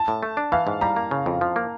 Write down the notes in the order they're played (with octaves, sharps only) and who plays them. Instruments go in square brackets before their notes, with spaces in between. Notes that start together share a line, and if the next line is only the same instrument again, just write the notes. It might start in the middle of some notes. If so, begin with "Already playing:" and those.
Already playing: [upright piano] A5
[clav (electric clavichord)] A2
A3
D4
[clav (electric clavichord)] E3 [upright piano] F5
[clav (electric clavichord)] G#2
[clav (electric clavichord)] G3 [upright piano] A#5
[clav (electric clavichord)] A#3
C#3
F2
F3
A#3